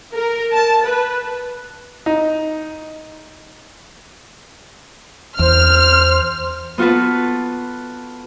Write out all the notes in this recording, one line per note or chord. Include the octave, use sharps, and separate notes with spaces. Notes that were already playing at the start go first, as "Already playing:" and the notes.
A#4
A5
B4
D#4
E2 C5 F6
B3 F4 F#4 A4 B4